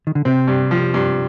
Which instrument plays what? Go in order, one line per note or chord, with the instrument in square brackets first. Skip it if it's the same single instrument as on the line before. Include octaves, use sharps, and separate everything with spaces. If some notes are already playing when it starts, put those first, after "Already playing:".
[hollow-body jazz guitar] D#3
D3
[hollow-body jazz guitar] C3 [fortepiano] C4
[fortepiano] G2
F3
G2